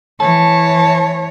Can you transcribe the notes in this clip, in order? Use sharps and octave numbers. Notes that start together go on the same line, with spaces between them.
E3 C#5 A5